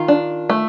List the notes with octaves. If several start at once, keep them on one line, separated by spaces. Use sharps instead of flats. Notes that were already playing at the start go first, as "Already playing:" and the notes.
Already playing: D#3 F4
D4
A3